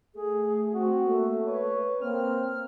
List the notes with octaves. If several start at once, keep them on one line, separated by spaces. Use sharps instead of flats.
A3 G#4
C4 F#4
A3 A#3
B4 C#5
A#3 C4 F6